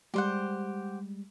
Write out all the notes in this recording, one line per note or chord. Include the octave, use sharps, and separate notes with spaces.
G3 G#3 G4 C5 F#5